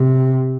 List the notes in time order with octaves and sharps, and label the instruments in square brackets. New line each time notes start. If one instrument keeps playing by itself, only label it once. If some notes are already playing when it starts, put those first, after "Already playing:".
Already playing: [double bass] C3